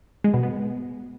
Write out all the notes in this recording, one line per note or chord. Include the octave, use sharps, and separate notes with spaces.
G#3
B2
B3